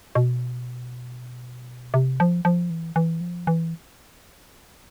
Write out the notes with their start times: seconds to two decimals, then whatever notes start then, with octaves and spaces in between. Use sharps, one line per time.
0.15 B2
1.94 C3
2.20 F3
2.45 F3
2.70 E3
2.96 E3
3.21 F3
3.47 E3